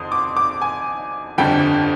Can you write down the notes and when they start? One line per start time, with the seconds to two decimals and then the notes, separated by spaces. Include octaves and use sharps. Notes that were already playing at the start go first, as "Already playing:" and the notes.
Already playing: F2 D#3 C6 D#6
0.12 D6
0.37 D6
0.62 G#5
1.38 G1 F2 D3 G3 G5